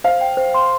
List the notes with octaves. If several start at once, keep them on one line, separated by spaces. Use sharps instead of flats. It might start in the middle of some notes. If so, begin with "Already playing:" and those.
C5 F5
G5
C5
C6